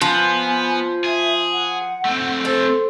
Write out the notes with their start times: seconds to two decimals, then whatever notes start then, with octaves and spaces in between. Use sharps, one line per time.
0.01 F3 B3 B4 G#5
1.04 G#4 E5
1.52 F#5
2.05 A3 C4
2.45 A4 C5